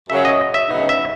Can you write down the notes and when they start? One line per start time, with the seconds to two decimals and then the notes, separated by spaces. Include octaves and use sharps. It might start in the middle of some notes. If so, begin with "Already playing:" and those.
0.10 F#2 C#3 F#3 E5
0.25 D#5
0.54 E5
0.69 D2 C#3 F#3 B3 D#4
0.89 E5